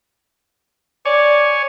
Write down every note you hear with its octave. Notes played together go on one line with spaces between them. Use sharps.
C#5 D5 G#5